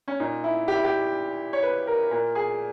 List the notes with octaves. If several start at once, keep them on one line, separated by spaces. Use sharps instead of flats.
C#4
A#2 D#4
E4
G4
E4
G4
C#5
B4
A#4
A#2 A#4
G#4